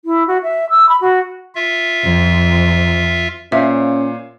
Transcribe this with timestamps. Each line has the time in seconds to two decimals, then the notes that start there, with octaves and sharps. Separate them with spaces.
0.05 E4
0.27 F#4
0.43 E5
0.69 E6
0.88 B5
1.01 F#4
1.55 F4 E5
2.04 F2
3.52 A#2 C#4 C5 C#5 E5 F5